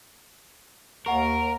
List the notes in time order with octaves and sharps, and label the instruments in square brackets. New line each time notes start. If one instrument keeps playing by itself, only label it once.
[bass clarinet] D#2 [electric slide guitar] A#4 [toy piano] D#5 F#5 C#6